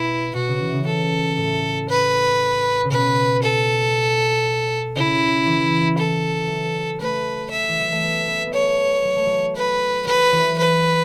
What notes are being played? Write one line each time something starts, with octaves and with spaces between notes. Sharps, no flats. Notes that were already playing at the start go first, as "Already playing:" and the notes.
Already playing: B2 E4
B2 F#4
C#3
E3
C#3
A4
A2
B4
C#3
B2 B4
A4
C#3 E4
E3
A4
E3
F#3
A3 B4
E5
E3
F#3
A3
B3
B3
B3
A3 C#5
F#3
A3
F#3
B4
F#3 B4
E3
B4